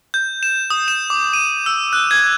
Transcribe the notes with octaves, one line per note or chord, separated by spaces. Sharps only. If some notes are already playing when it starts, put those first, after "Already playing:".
G6
E7
D#6
E7
D6
D#7
E6
F#6
G#6